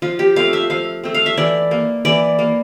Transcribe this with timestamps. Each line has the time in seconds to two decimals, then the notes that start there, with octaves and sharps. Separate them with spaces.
0.02 F3 F4
0.19 G4
0.36 A3 C4 F5
0.53 E5
0.70 F3 F5
1.04 A3 C4
1.14 F5
1.26 E5
1.37 E3 D5
1.71 A#3
2.05 E3 D5
2.39 A#3